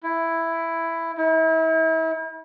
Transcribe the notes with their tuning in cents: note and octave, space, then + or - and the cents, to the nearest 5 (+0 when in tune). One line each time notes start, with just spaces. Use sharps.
E4 +5
E4 -40